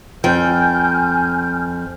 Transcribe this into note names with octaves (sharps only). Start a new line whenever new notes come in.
F2 G5 G#5 F6 G6